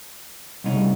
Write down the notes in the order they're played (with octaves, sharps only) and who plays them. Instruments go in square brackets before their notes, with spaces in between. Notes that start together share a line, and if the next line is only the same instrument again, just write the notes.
[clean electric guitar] C2 D#4 [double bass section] C#3 G3 A3